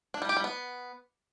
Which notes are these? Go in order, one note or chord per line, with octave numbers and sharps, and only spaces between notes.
D4
G3
G4
G3
B3